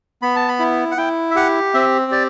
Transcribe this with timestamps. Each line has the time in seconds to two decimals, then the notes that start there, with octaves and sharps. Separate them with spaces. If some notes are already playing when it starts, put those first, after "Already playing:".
0.22 B3 B5
0.36 A5
0.48 B5
0.60 E4
0.91 F#5
0.97 E4 G5
1.31 E5
1.35 G4 F#5
1.74 C4 E5
2.12 G4 D5